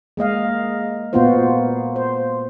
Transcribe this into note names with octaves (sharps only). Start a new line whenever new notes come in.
G#3 A#3 D#5 F5
A#2 A#3 B3 F4 F#4 C5
C5